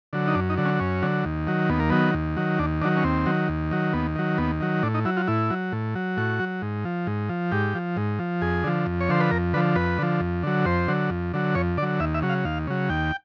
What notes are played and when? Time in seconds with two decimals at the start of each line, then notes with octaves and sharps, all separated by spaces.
0.13 D3 F#3
0.28 D#4
0.35 F#2 D4
0.50 D#4
0.57 D3 F#3
0.65 C#4
0.80 F#2 C#4
1.02 D3 F#3
1.25 D#2
1.47 D#3 F#3
1.69 D#2 B3
1.80 A#3
1.90 D#3 F#3 B3
2.14 D#2
2.37 D#3 F#3
2.59 D#2 D4
2.81 D#3 F#3 D4
2.96 C#4
3.04 D#2 C4
3.26 D#3 F#3
3.49 D#2
3.71 D#3 F#3
3.93 D#2 B3
4.16 D#3 F#3
4.38 D#2 B3
4.61 D#3 F#3
4.83 A2 D4
4.94 D#4
5.05 F#3 E4
5.17 F4
5.27 A2 E4
5.50 F#3
5.72 A2
5.95 F#3
6.17 A2 F#4
6.39 F#3
6.62 G#2
6.85 F3
7.07 G#2
7.29 F3
7.52 G#2 G4
7.75 F3
7.97 G#2
8.19 F3
8.41 F2 G#4
8.64 D3 F3
8.86 F2
9.00 C#5
9.09 D3 F3 C5
9.20 B4
9.31 F2 A#4
9.54 D3 B4
9.57 F3
9.76 F2 B4
9.99 D3 F3
10.21 F2
10.43 D3 F#3
10.65 F2 C5
10.88 D3 F#3
11.10 F2
11.33 D3 F#3
11.55 F2 C#5
11.78 D3 F#3 D5
12.00 D#2 E5
12.14 E5
12.22 C#3 F#3
12.29 F5
12.45 D#2 F5
12.67 C#3 F#3
12.89 D#2 G5